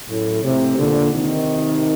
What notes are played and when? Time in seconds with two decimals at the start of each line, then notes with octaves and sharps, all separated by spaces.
0.08 F#2 A2
0.43 A2 C3
0.78 A#2 D3
1.12 C3 D#3